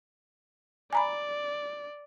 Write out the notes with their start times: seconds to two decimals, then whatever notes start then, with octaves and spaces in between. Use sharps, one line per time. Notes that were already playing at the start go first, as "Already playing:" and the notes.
0.93 D5 G#5 A#5 B5